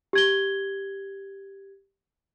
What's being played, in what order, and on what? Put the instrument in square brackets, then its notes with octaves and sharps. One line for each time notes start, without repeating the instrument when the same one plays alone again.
[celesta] G4 G#6 G7